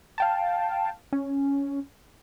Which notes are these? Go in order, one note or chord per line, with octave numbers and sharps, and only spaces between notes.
F5 G5 A5
C#4